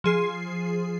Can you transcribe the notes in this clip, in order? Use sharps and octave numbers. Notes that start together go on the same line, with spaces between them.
F3 G#4 C7